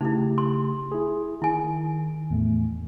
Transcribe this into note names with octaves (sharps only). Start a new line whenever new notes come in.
C#3 A3 D#4 E4 G4
C6
E4 G#4
D#3 E4 G#5
E2 A2 A3